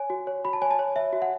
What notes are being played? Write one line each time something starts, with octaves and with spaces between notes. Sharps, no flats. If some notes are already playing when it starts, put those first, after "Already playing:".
Already playing: C#5 G#5
F#4
C#5
F#4 B5
A5
C#5 G#5
A5
C#5
C#5 E5
F#4
F#5